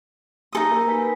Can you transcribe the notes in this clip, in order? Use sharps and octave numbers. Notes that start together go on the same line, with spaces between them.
D#4 A4 D#6
A#3 A#4
B4 G#5 B6